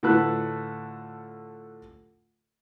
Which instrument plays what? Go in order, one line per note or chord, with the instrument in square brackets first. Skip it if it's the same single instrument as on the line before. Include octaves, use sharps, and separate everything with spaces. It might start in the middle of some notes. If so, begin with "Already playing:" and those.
[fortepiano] A2 D3 F3 A4 B4 F#6